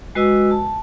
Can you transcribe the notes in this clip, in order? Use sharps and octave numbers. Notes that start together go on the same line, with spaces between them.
G#3 F#4 B4 D#5 G#5 E6
A5